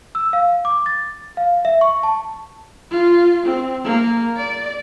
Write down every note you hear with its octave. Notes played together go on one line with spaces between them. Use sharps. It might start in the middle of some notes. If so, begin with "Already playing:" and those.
E6
F5
D6
A6
F5
E5
C#6
A5
F4
C4
A#3
D5